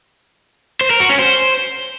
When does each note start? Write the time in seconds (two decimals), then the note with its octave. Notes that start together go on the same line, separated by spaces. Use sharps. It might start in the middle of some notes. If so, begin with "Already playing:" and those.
0.81 C5
0.90 A#4
1.00 F#4
1.10 C#4
1.19 C5